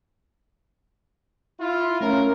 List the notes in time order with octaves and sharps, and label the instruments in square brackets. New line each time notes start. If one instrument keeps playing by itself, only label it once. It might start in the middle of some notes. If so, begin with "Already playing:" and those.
[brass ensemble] E4 F4
[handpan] A3 C#4 [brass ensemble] A#4